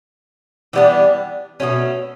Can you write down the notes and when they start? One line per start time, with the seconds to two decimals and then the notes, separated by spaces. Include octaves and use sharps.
0.73 E3 G3 B3 D4
1.60 B2 F#3 A3 C#4